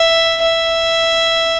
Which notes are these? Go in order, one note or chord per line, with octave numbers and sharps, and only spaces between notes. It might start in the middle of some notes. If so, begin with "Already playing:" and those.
Already playing: E5
E5